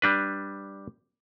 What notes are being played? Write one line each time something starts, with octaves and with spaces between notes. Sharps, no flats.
G3 D4 B4